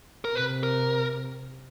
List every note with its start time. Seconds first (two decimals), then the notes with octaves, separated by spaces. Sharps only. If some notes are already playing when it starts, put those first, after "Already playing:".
0.25 A#4
0.35 C3 B4
0.63 A#4